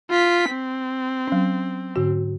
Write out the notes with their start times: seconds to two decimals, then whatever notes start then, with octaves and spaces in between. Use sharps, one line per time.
0.10 F4 B6
0.50 C4
1.28 F#3 C#4
1.96 G#2 D3 F#4